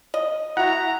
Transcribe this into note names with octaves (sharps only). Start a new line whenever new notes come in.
D#5
E4 F#4 F#5 A#5